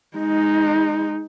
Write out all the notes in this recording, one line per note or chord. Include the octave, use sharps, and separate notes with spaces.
G#3 D#4